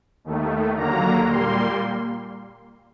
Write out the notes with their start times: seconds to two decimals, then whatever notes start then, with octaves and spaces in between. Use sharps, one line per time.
0.24 D#2 D#3 A3
0.77 D#2 D3 F#3 A#3 A#5
1.29 A#2 G3 A#3 C6